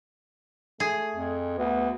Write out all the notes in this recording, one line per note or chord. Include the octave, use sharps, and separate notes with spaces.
A3 G#4
F2
D2 B3